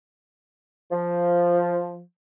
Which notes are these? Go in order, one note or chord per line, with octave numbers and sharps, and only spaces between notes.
F3